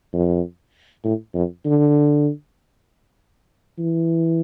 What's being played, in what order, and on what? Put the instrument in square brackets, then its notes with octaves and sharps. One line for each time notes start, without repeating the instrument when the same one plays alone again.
[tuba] F2
A2
F2
D3
E3